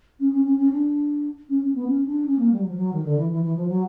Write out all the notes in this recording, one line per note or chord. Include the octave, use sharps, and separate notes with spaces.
C#4
C#4
C#4
C#4
D4
C#4
C#4
B3
C#4
D4
C#4
A#3
G3
F#3
F3
F#3
D#3
D3
E3
E3
E3
F3
F#3